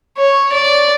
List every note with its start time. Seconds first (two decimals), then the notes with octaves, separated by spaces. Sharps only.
0.17 C#5
0.53 D5